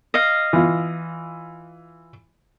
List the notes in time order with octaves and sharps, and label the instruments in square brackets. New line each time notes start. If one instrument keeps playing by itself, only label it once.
[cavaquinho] D#5 F5
[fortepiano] E3 F4